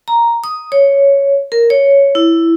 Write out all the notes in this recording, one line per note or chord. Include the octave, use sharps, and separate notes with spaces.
A#5
D#6
C#5
A#4
C#5
E4